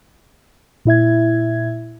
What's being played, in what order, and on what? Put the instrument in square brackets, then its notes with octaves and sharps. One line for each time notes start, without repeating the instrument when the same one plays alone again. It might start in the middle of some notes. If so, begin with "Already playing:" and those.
[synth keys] A#2 E4 E5 G#6